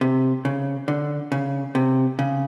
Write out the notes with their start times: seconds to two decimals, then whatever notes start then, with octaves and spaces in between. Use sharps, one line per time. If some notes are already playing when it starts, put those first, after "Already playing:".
0.01 C3
0.45 C#3
0.88 D3
1.32 C#3
1.75 C3
2.19 C#3